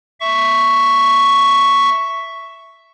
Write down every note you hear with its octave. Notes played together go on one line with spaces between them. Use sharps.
E5 C#6